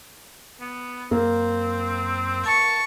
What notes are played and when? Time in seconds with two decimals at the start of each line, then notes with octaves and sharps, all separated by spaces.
0.60 B3
1.11 F#2 A#3 C4
2.46 A5 C#6